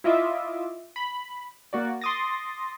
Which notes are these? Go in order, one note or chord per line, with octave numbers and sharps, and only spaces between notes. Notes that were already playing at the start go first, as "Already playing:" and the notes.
E4 F4 D#5 E5 D6
B5
A#3 F#4 D5
C6 D6 D#6 A6 A#6